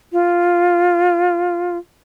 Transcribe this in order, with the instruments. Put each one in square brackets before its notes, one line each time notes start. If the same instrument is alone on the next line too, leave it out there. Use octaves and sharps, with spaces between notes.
[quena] F4